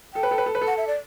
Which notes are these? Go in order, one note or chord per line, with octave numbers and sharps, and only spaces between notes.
A4 G5
B4
A4
B4
A4
B4
A4
F#5
E5
D5